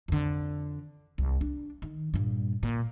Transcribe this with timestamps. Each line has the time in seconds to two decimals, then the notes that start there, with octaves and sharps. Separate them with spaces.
0.08 F2 D3
1.18 C2
1.41 D4
1.82 D#3
2.14 G2 A#2
2.63 A#2